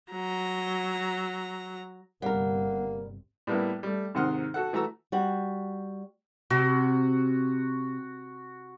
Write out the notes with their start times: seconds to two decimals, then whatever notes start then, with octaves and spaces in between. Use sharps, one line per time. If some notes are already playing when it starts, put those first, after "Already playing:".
0.12 F#3 A#5
2.22 G1 C3 G3 A#3 A#4 F#5
3.47 A2 G3 A#3 B3 E4
3.83 G3 A3
4.15 G#2 C3 D#3 F#5 C6 F6
4.54 F#4 A4 F#5
4.73 E3 A3 F#4 A#5 E6
5.12 G3 F#4
6.50 C3 F#4